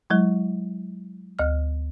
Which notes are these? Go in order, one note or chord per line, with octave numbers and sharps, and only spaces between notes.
F#3 G#3 E4
D2 F6